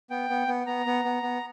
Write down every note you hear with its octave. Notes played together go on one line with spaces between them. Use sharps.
B3 G5
B3
B3
B3 A#5
B3
B3
B3